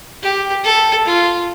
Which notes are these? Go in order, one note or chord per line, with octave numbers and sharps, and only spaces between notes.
G4
A4
F4